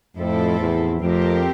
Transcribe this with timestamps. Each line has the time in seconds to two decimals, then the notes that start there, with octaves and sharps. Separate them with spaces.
0.16 F2 A2 F3 C4 E4 A4
0.59 E2
1.01 F2 A3 C4 G4 A#4